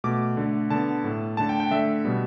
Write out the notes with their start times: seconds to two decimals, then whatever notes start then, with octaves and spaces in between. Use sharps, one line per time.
0.04 B2 A3 D6
0.37 D3 A3
0.70 D3 B3 A5
1.04 A2 A3
1.37 D3 A3 A5
1.49 G5
1.60 G5
1.71 D3 A3 E5
2.05 B2 G3 B3